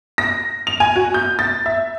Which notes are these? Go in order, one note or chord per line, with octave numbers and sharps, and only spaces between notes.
A#6
F7
G#5
F#4
G6
A6
E5